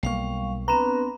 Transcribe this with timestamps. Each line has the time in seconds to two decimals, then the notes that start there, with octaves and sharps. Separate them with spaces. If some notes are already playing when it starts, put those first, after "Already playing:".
0.03 B1 G3 A#3 F5 C#6
0.68 B3 C4 D4 B4 A#5